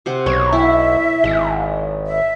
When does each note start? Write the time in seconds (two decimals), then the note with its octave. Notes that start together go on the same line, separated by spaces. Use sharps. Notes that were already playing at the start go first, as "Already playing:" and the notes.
0.06 C3 C5 F#5
0.26 B1 C#5
0.53 E4 E5
1.24 G#1 G#3
2.07 E5